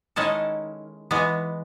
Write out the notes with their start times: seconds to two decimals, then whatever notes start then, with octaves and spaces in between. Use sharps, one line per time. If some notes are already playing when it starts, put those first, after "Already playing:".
0.16 D#3 G#3 C#4 E4 A4
1.11 E3 G#3 B3